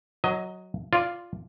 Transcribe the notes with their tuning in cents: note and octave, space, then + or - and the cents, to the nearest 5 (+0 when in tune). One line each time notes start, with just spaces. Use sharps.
F#3 +0 D#5 +20
F4 +0 D5 +0